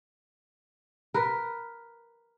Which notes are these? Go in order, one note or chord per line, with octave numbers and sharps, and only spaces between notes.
A#4 B4